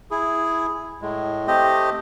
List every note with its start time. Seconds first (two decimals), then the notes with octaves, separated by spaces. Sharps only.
0.11 E4 G#4
1.01 A2 G#3
1.47 A3 C4 G4 D#5